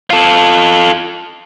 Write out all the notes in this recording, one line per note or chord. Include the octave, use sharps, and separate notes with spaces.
F4 A4